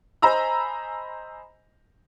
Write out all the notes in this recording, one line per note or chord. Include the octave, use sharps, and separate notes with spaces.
C5 D#5 G#5 A#5 B5 E6